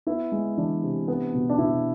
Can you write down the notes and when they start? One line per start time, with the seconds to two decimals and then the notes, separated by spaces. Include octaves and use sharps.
0.07 B3 E4
0.32 G#3
0.58 E3 D4
0.83 C3
1.08 B3
1.34 B2
1.49 D4
1.58 B2 E4